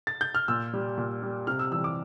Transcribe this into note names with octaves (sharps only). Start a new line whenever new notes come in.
A6
G6
F6
A#2 E6
G3
A#2
G3
C3 F6
E6
E3 G3 E6
D6